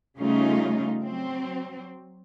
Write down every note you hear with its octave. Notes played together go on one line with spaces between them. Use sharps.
C#3 G3 A3 C#4 D#4 F4
F#3 C4